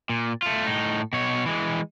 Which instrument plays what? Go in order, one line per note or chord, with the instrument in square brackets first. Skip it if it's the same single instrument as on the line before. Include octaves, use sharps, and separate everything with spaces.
[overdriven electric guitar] A#2
A3 F4
A2 D#4
B2 C#5
E3 G#3